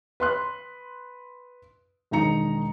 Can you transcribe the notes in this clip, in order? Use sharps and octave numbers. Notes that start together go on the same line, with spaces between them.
B4 C6 F#6
E1 D#3 D#4 A#5 C#7